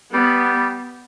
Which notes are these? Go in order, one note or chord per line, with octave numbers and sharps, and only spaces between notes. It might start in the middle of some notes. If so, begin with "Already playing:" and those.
G3 B3